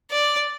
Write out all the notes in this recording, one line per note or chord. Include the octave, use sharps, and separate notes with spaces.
D5